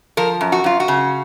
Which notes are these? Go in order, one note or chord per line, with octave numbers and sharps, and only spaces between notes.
F3 A#4
F#2
F#4
F#2 F4
F#4
C#3